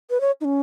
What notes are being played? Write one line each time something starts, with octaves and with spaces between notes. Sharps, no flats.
B4
C#5
D#4
C#4